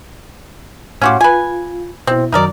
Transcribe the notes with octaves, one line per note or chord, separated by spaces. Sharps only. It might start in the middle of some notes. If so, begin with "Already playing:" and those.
A2 C#4 F#4 G4 F5 C6
F4 B4 G#5
B2 C4 E4
F#2 D#3 F#3 D#4 A#4 D5